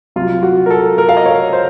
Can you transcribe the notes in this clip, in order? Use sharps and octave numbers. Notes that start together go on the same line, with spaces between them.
C2 C3 F#3 F4
F#4
A#4
A4
A#4
F5
D#5
C#5
C5